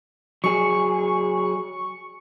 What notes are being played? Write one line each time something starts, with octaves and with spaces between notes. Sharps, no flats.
F#3 G#4 C#6